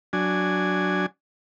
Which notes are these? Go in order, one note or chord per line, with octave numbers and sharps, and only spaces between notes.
F#3 D4 G#5